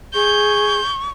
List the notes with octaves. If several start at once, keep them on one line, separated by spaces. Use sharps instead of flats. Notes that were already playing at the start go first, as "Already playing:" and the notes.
G#4 C#6 G6